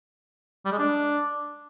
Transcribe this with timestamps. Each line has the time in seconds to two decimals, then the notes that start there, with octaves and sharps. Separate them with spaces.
0.65 G3
0.72 G#3
0.79 D4